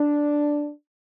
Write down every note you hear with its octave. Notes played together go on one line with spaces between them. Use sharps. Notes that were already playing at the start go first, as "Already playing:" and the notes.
Already playing: D4